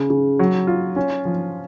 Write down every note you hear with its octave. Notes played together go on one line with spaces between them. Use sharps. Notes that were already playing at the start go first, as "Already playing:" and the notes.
Already playing: C#3
C#3
F#3
F4
C#4
F3